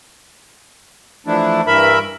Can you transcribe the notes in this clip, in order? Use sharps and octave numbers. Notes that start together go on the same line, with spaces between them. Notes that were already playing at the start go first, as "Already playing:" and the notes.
E3 F3 A3 D4 E4
G2 E3 A#4 E5 B5